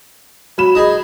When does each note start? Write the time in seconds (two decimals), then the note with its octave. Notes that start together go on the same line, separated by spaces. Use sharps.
0.58 F#3 B5 E7
0.75 D#4 G#4